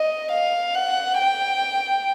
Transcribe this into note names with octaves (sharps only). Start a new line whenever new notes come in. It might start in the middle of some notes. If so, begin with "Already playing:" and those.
Already playing: D#5
F5
F#5
G5